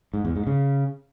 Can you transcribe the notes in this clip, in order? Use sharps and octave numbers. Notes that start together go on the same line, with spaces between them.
G#2
E2
G#2
C#3